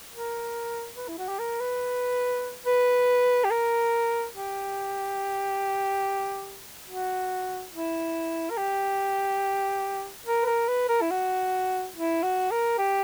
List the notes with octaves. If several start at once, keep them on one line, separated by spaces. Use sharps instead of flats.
A#4
B4
E4
F#4
G4
A#4
B4
B4
G4
A#4
G4
F#4
E4
A#4
G4
A#4
B4
A#4
B4
A#4
E4
F#4
E4
F#4
A#4
G4